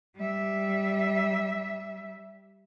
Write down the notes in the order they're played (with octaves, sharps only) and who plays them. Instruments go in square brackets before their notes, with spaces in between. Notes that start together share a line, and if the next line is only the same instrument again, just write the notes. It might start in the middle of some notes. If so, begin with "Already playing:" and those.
[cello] G3 E5